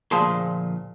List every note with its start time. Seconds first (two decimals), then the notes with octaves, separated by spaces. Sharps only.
0.11 D2 A#2 F3 G#4 A5 C6